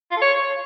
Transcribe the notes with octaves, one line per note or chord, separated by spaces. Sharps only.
F4
A4
C#5